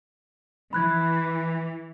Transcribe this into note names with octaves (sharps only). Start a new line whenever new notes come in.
E3 B5 F#6 G#6